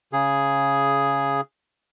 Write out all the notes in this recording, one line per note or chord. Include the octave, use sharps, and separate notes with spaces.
C#3 G#4